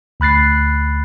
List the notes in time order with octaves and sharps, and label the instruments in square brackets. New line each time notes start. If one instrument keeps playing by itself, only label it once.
[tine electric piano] D2 B5 F#6 A6 C7